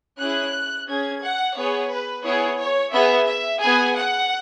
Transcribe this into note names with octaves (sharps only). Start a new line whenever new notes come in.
C#4 E4 G#4 F#6
C#4 G#4 G#6
F#5
B3 G#4 C#5
B4
B3 E4 G#4 C#5
C#5
B3 G#4 E5
E5
B3 G#4 G#5
F#5